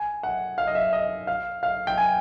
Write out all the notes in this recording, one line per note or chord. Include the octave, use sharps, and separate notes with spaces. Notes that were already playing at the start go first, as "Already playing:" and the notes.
Already playing: G#5
F#5
F5
D#5
E5
D#5
F5
F5
G5
G#5